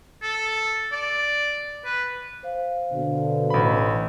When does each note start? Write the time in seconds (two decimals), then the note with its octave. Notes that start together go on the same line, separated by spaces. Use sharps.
0.22 A4
0.92 D5
1.85 B4
2.43 C5 F5
2.91 B2 D3
3.50 A1 B5